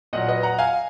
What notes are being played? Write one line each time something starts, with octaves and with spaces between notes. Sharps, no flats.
A#2 F#3 D#5 F#5
B4 D#5
F#5 A#5
F5 G#5